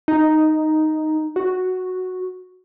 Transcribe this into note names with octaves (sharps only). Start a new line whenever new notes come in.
D#4
F#4